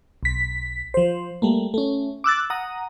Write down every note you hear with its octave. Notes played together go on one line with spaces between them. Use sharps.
B1 B6
F3 C5
G3 A3 A#3
A3 C#4
D6 E6 F#6 A6
F#5 A#5 D#6